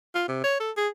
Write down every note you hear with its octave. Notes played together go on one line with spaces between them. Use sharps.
F4
C3
C#5
A4
G#4